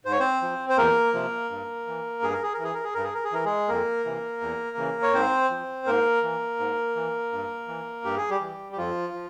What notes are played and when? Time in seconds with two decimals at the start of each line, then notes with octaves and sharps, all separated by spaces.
0.05 G#2 C5
0.12 C#5
0.19 C4 C5
0.42 F3
0.70 C5
0.77 E2 A#3 A#4
1.14 C3 F3
1.50 G2
1.87 E3
2.23 G2 G#4
2.33 A#4
2.43 G#4
2.54 A#4
2.59 E3
2.64 G#4
2.74 A#4
2.84 G#4
2.94 G2 A#4
3.04 G#4
3.14 A#4
3.24 G#4
3.32 E3 A#4
3.45 G#3 G#4
3.69 F2 A#3 A#4
4.05 C3 E3
4.41 E2
4.77 C#3 E3
5.02 C#5
5.14 G#2 C4 C5
5.50 F3
5.86 G#2 A#3 A#4
6.23 E3
6.59 G#2
6.96 E3
7.32 G2
7.68 E3
8.05 G2 G4
8.17 G#4
8.30 G3 G4
8.40 E3
8.73 G4
8.77 F2 F3 F4
9.14 F3